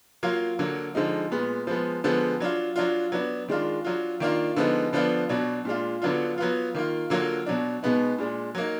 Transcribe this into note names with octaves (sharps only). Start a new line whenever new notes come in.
F#3 A#3 F4
D3 F#3 A#3
D3 F3 G#3 D#4
A#2 G#3 B3
F3 G#3 B3
D3 F3 G#3 B3
F#3 D4 F4
F#3 D4 F4
F#3 B3 D4
D#3 G#3 D4 F4
F#3 D4 F4
D#3 A#3 D4 F4
D3 F3 G#3 B3 D#4
D3 F3 B3 D4 F4
B2 F#3 D4
A#2 G#3 D4 F4
D3 F#3 B3 D4 F4
F#3 B3 F4
D#3 A#3 F4
D3 F#3 A#3 F4
B2 F#3 D4
B2 G#3 B3 D#4
A#2 G#3 D4
F#3 A#3 D#4